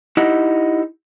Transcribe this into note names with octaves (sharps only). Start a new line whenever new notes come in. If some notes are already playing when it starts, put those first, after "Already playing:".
D#4 E4 G4 D#5 F#5